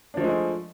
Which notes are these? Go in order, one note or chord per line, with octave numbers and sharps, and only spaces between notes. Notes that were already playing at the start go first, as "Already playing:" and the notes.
F3 G#3 A3 D4